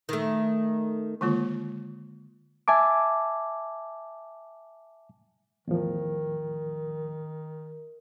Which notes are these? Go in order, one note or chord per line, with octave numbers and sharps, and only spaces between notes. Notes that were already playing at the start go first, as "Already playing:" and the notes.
D#3 A3
D3 D#3 G#3 A#3 F4
E5 G#5 A5 D6
E2 A2 D#3 F3